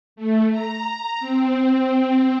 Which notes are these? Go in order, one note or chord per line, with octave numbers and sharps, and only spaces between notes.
A3
A#5
C4